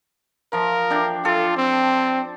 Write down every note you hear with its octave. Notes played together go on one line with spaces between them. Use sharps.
F3 A#4
D4 G5
F4 A4
C4